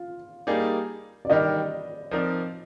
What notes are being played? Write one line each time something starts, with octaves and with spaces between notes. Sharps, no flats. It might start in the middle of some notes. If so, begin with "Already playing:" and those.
Already playing: F4
G3 A#3 D#4 G#4 D5
D5
D#3 G3 D4 G4 A#4 D#5
F3 C4 D#4 A#4 D5